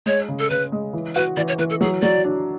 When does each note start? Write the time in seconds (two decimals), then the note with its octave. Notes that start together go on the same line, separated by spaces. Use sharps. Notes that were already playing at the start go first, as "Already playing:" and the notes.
0.06 G#3 C#5
0.28 C#3
0.39 A4
0.50 C#3 B4
0.72 G#3
0.93 E3
1.15 F#4 B4
1.37 E3 D5
1.48 C#5
1.59 E3 B4
1.70 A4
1.81 F#3 G#4
2.02 F#3 D5
2.24 D4